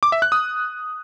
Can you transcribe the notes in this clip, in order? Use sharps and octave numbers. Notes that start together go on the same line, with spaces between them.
D6
E5
F#6
D#6